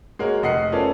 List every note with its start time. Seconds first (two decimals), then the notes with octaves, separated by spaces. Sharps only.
0.19 G#3 A#3 F#4 A#4 C#5
0.43 F1 D#5 F#5 C7 C#7
0.72 B3 C#4 F4 A4 A#4 D5